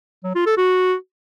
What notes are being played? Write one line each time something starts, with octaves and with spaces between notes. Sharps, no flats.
F#3
F4
A4
F#4